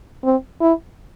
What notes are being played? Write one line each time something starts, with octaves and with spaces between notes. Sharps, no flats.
C4
E4